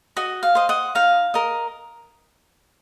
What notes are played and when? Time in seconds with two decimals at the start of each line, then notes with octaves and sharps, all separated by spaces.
0.16 F#4 D#5
0.43 F5
0.55 C5 D#5
0.69 D#5 F#5
0.95 D#4 F5
1.34 A#4 D#5